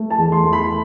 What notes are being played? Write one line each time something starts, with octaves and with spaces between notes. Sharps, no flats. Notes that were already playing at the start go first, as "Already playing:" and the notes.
Already playing: A3
A5
E2
C6
A3
B5